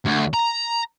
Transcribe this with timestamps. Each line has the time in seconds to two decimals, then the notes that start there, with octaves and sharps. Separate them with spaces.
0.05 D2
0.34 A#5